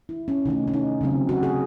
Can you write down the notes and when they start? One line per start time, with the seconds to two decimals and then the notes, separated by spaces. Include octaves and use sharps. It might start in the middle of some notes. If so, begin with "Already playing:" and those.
0.09 E4
0.28 C#4
0.45 C3 D#3 A3 C#4 D#4
0.68 C#4
0.74 D#4
1.01 C#3 F#3 C4
1.29 F#4
1.43 G#4